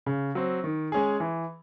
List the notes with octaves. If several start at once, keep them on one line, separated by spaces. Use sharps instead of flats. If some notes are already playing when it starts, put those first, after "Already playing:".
C#3
F#3 C4
D#3
G#3 C#4 G#4
E3